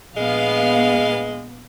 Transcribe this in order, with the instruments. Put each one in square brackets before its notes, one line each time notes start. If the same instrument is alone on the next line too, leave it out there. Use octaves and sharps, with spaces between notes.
[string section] A#1 B3 F5 [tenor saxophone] G#3